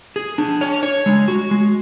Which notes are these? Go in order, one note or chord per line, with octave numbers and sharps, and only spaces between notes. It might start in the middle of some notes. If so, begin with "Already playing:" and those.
G#4
D4
C#5
C#5
G#3
F#4
G#3